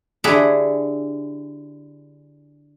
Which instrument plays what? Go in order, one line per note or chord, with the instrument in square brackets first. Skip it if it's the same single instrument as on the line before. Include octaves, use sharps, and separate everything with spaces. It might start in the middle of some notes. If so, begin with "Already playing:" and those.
[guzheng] D3 E4 G4 G#4 E5 F#5